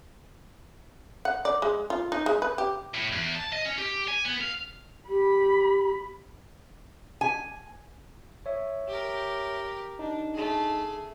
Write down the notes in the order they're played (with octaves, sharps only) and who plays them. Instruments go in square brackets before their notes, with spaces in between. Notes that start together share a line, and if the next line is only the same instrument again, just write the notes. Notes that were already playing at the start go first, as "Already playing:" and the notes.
[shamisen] F#5
D5
G#3
F4
D#4
G#3
B4
G4
[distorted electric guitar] A2
E2
A5
D#5
C#4
G4
G#5
B3
F5
[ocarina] G4 [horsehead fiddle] B5
[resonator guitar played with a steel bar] G#5
[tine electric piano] C#5 E5
[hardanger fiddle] G4 A#4
[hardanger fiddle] D4 [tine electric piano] D#4
[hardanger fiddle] A3 G#4